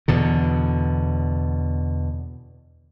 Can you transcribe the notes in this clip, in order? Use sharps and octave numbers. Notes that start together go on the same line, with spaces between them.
E2 B2 D3